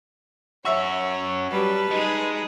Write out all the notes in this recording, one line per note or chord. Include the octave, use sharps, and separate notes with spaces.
C#4 F#4 C#5 E5 C#6
F#3 G3 B4 A5
G#3 D#4 G#4